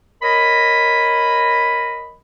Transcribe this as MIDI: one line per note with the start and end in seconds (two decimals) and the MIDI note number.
0.22 2.14 70
0.22 2.14 73
0.22 2.14 75
0.22 2.14 83